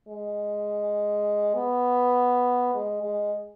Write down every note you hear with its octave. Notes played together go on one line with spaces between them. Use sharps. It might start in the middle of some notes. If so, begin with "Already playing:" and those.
G#3
B3
G#3
G#3